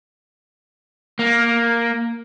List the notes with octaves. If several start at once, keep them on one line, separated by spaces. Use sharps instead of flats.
A#3